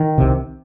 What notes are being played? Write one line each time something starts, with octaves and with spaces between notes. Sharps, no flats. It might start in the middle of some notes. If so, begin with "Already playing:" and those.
Already playing: D#3
C2 C3